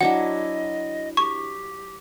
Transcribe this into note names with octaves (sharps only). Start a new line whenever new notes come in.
F#3 D4 E4 D#5 F#5
G4 C#6